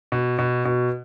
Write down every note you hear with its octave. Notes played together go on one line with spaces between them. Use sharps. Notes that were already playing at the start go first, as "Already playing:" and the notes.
B2
B2
B2